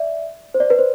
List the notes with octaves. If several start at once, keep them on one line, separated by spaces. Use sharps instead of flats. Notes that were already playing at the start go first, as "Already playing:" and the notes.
Already playing: D5 E5
C5
D5
B4
C5